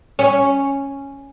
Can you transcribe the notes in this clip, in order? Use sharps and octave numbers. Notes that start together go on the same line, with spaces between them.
C#4